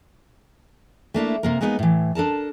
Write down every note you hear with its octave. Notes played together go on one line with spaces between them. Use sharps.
A3 A#3 D4 E4
C3 A#3 A#4
G#3 A#3 B3 D4 D#4
A2 E3
D4 A4 A#4 A5